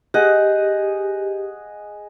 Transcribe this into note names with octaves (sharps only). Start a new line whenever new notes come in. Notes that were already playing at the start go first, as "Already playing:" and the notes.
G4 G#4 D#5 F#5